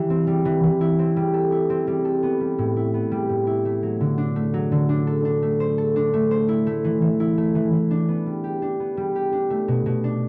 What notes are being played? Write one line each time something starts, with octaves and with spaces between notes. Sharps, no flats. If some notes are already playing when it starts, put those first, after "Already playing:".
Already playing: E3 G3
C4
G3
E3
E3
E4
C4
G3
A4
E4
C4
G3
A4
B3
G3
A2
E4
B3
G3
A2
E4
A3
F#3
D3
D4
A3
F#3
D3
D4
A4
D4
A3
C5
A4
D4
A3
C5
E4
A3
E3
E3
E4
A3
E3
E3
D4
B3
G3
G4
D4
B3
G3
G4
D4
A3
B2
B2
D4